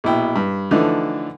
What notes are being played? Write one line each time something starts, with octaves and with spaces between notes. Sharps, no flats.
A#1 B2 E4 G5
G2
D3 E3 F3 A3 D#4